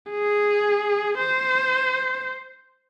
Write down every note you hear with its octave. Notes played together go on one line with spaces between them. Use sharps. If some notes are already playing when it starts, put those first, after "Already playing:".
G#4
C5